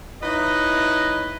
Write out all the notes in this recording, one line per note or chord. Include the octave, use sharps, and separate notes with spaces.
D#4 E4 B4 C#5 D#5